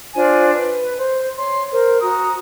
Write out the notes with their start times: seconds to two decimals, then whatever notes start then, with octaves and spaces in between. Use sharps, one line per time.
0.14 D4 F4 C5 G#5
0.55 B4
0.98 C5
1.37 C#5 C6
1.73 A#4 C5
2.00 F#4 A#5 D#6